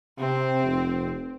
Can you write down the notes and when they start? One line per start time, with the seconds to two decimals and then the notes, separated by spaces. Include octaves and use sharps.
0.19 C3 C4
0.64 F1